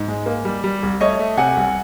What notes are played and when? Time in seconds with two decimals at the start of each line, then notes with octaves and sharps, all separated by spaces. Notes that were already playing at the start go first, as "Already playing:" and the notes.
Already playing: G#2
0.08 G#3
0.26 A#3
0.45 G3
0.64 G3
0.83 C2
1.01 A3 C#5 D#5
1.19 A3
1.37 C3 F#5 G#5
1.56 C2